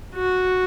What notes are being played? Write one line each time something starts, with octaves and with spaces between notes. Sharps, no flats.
F#4